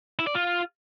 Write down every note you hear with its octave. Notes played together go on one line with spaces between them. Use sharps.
E4
D5
F4